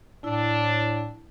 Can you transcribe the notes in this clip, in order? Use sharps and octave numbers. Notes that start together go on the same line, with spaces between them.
A2 D4 E4